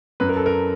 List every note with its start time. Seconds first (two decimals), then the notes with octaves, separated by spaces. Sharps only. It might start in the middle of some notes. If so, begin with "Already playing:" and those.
0.20 F#2 B4
0.29 A#4
0.36 A4
0.46 A#4